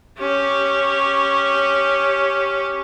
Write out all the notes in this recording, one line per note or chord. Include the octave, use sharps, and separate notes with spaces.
C#4 G4